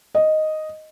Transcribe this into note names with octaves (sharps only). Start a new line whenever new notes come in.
D#5